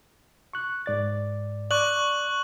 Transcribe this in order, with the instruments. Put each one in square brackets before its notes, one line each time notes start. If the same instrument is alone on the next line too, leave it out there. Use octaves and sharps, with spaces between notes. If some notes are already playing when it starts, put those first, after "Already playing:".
[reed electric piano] C#6 F#6
G#2 D5 A6
[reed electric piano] D5 [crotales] C#6 F#6 F#7